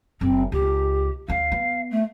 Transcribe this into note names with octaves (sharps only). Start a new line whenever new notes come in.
F#1 C4 C#4
C#2 G4
D2 C#4 F5
B3
A3